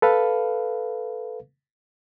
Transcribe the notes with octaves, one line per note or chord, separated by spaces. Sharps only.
A4 B4 F5